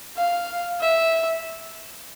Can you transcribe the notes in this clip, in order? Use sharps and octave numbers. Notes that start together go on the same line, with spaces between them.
F5
E5